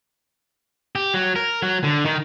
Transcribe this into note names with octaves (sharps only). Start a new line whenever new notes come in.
G4
F#3
A#4
F#3
D3
D#3